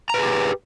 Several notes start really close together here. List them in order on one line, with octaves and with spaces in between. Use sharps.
A#5 B4 G#4 G4